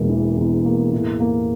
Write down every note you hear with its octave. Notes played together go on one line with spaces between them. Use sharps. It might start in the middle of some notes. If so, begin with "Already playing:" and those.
Already playing: E1 E2 A#3
E3
E2
A#3
A2
A#3